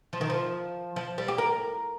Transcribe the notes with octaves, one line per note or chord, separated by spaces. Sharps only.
F3
D#3
F3
F3
G3
G4
A#4